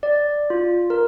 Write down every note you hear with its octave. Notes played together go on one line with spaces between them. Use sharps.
D5
F4
A#4